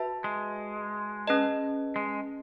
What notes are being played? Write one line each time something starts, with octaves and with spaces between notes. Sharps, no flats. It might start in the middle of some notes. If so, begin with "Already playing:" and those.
Already playing: F#4 B4 E5 A5
G#3
C#4 G#4 B4 D#5 A5
G#3